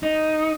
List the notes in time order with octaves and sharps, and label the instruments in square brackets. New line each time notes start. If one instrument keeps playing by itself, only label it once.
[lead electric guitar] D#4